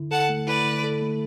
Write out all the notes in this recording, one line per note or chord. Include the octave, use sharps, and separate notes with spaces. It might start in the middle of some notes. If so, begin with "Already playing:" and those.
Already playing: D3 E4
A4 F#5 A5
A3
E4 B4 D5
D3
A4
A3